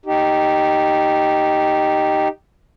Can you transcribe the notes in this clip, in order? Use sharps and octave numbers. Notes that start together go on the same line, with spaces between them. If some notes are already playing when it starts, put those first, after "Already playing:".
D#4 G4